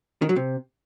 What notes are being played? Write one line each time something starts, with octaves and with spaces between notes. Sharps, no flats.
D#3
F#3
C3